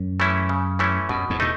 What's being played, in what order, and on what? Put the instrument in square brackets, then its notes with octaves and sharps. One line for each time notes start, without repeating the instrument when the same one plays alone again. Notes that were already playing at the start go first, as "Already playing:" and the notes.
Already playing: [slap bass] F#2
[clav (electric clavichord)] E3 A3 C#4 E4
C#3
E3 A3 C#4 E4
[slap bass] F#2 [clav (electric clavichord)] B2
[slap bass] E2 G#2
[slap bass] B2 [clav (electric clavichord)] A3 D#4